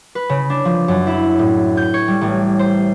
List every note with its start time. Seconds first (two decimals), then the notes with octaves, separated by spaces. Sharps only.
0.15 B4
0.29 C#3
0.50 D4
0.65 F3
0.88 F#2
1.07 E4
1.39 A2
1.77 G6
1.94 C#5
2.08 G3
2.21 A1
2.59 C5